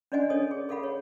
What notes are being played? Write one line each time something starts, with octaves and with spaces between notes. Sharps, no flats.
C#4 D4 D5 D#5 F#5 G#5
A4 C#5 G#5 D#6
G#4
G#4 A4 F5 F#5 B5
C#5